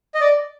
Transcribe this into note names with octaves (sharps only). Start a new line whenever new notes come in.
D#5
D5